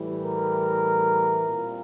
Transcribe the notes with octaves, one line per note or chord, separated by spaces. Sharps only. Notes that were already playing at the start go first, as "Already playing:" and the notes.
Already playing: A2 E3 G3
A#4
A#2 G3 C4